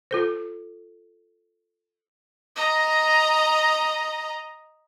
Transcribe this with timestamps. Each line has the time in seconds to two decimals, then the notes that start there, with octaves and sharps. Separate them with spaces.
0.11 F4 A4 C5
2.56 D#5 A#5